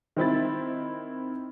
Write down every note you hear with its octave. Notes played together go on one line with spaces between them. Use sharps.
D#3 C4 E4 A6